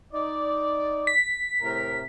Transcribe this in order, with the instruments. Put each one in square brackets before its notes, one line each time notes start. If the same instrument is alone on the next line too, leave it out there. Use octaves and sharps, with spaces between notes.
[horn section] D#4 D5
[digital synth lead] B6
[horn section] A2 C3 A#4